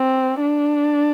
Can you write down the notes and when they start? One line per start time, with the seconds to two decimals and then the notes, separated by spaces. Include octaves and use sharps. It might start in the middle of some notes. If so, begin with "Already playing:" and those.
Already playing: C4
0.42 D4